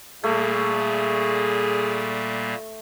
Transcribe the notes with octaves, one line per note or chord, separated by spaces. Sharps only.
A#2 G3 A3 A#3 G#4